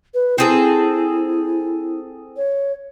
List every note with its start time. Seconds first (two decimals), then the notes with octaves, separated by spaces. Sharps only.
0.14 B4
0.38 C4 E4 G#4 A4
2.37 C#5